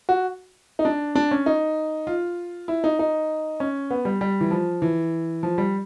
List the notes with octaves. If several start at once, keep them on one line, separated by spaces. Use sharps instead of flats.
F#4
D#4
D4
D4
C#4
D#4
F4
E4
D#4
D#4
C#4
B3
G3
G3
E3
F3
E3
F3
G3